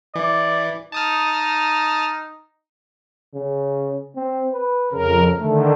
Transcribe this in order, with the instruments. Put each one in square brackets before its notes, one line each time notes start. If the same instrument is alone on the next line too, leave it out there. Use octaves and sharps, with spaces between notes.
[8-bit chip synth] E3 [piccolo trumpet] D5
[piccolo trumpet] D#4 [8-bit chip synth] A5 D#6 F6
[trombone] C#3
C4
B4
[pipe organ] F2 A#4 [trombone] C#3
[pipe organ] D3 D#3 [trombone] A3